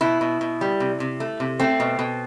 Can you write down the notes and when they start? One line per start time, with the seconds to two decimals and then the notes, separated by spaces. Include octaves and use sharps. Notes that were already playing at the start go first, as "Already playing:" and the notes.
0.01 B2 E4
0.21 B2
0.41 B2
0.61 G3
0.80 C3
1.00 C3
1.20 A3
1.40 C3
1.60 A3 C4
1.80 B2
1.99 B2